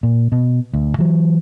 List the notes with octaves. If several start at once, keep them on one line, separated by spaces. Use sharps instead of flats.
A#2
B2
D2
E3 F#3